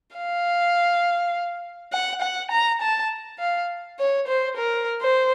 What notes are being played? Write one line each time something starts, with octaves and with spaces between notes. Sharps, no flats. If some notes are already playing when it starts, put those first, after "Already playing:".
F5
F#5
F#5
A#5
A5
F5
C#5
C5
A#4
C5